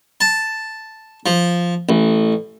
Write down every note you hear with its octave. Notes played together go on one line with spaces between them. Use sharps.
A5
F3
A1